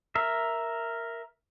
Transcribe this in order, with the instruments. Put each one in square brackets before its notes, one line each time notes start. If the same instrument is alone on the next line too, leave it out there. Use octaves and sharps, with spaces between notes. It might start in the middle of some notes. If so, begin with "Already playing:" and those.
[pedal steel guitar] A#4 E5